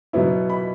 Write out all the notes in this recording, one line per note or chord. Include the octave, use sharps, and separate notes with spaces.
B2 F#3 B3 E4
B5